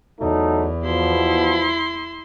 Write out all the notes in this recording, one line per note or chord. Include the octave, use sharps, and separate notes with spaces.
E2 F#3 A3 D#4
B2 F3 E4 C6